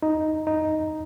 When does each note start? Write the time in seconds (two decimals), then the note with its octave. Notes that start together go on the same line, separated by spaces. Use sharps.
0.03 D#4
0.47 D#4